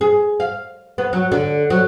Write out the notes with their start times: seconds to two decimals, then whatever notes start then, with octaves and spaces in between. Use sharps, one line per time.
0.01 G#4
0.40 F5
0.98 B3
1.13 F#3
1.32 D3
1.70 F#3